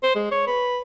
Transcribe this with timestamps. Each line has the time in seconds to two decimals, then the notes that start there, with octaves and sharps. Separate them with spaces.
0.03 C5
0.15 G#3
0.32 C#5
0.47 B4